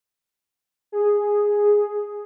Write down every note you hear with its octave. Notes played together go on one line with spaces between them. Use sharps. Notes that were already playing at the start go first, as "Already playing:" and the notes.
G#4